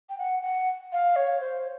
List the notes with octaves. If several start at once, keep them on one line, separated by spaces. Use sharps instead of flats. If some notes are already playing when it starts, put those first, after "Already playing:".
G5
F#5
F#5
F5
C#5
C5